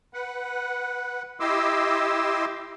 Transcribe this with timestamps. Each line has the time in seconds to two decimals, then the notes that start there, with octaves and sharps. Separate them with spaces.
0.14 B4 F#5
1.40 E4 G4 D#5 C6 D6 E6